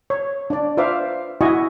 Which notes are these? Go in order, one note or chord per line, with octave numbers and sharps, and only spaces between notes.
C#5
D4 D5
F4 B4 C5 E5 F5 D6
E4 F#4 D#5 G#5 C#6